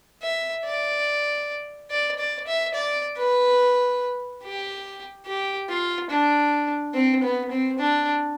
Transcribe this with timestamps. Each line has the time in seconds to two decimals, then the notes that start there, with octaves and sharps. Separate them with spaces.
0.22 E5
0.65 D5
1.91 D5
2.19 D5
2.47 E5
2.74 D5
3.17 B4
4.43 G4
5.26 G4
5.69 F4
6.10 D4
6.94 C4
7.23 B3
7.51 C4
7.79 D4